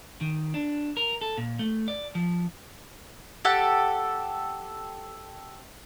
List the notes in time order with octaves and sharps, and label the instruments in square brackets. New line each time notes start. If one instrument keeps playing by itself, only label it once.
[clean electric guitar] D#3
D4
A#4
A4
A#2
A3
D5
F3
[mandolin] G4 A4 F#5